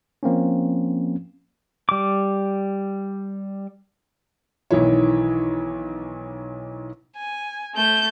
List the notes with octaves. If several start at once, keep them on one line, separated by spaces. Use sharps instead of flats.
F3 A#3 C4 C#4
G3 D6
B1 D#3 E3 E4 C#5
G#5
A3 G6